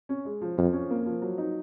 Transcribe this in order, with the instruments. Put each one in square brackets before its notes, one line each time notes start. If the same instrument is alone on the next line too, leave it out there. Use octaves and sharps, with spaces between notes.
[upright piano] C#4
G#3
F3
[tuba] F2 [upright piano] F3
[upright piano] C#4
A#3
F3
F#3
D#4